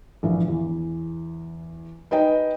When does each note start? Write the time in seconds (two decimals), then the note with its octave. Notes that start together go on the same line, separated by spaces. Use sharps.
0.23 A#1 E3
0.48 E2
2.11 D#4 B4 D#5 G5